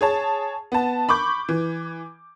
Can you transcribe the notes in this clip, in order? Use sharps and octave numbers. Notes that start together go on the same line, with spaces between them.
G#4 C#5 A5
B3 A5
B5 C#6 D6 G6
E3